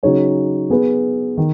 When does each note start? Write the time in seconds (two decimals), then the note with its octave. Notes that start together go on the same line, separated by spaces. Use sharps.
0.03 C#3 F#3 D#4 G#4 C#5
0.70 B3 G#4 B4
1.37 D#3